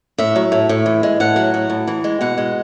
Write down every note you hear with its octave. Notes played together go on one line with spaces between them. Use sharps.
A2 E5
F#3
A2
A2
E3
G#3
A2 F#5
F#3
A2
A2
E3
G#3
B2 F#5
G#3